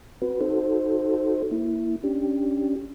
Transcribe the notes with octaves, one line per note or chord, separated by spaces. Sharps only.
C4 F#4 B4
D#4 F#4 A4 C5
A#3 E4
C#4 D4 G4